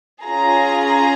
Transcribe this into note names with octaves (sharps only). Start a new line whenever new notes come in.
C#4 F4 G#4 A#5